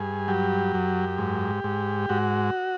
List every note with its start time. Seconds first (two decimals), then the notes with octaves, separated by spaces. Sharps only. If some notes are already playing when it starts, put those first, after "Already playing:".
Already playing: G2 G#4
0.28 F#3 G4
0.74 F#2
1.18 G#2
1.64 G#2
2.09 G#2 F#4